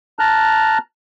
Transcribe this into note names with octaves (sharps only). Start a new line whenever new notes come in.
A5 A#5 F6 F#6